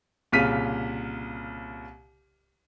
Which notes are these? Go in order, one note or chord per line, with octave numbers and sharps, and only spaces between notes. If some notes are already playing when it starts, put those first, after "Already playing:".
C2 A#2 C#3 F6 B6 D#7